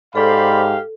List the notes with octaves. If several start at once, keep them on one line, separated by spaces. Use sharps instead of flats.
G#2 G4 A4 C5 D5 F5 B5